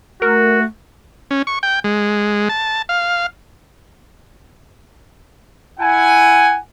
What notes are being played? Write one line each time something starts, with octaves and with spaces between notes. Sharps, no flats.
A3 F#4 A#4
C#4
C#6
G5
G#3
A5
F5
E4 F#5 G#5